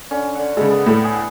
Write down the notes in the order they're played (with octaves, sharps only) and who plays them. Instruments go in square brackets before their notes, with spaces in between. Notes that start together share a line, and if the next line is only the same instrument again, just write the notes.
[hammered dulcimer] D3 C#4
D3 F#5
[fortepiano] C#3 G#3 [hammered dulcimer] A4 B4
[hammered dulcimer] B3 A4 F#5
[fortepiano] A2 A3
[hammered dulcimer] G#4 F#5